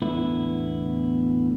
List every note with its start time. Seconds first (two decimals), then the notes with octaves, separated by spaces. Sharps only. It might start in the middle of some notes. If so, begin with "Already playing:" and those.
0.02 E2 A2 D3 B3 E4